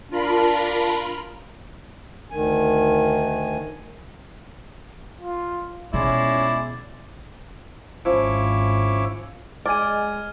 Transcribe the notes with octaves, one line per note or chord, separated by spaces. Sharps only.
D4 F4 A#4 B5
D2 D#3 G#5
F4
B2 G#3 C#4 E4 D5
G#1 F3 C#4 E4 D6
G#3 D5 D#5 G#5 F6 G#6 D#7